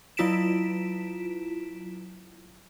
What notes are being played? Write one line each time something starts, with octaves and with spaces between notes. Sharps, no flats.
F#3 E4 F4 B6 D7 E7